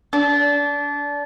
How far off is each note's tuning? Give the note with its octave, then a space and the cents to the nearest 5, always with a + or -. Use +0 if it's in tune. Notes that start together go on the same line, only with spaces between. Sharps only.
D4 -25